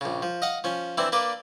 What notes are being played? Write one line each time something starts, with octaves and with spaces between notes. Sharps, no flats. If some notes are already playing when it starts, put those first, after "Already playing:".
A#1 C#3
F3
D#5 F5 F#5
F3 C#4
E3 C4 D4 E4
A#3 D4 B4 D5